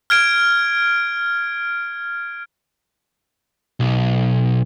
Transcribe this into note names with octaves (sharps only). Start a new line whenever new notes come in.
F6 G#6 D7
B1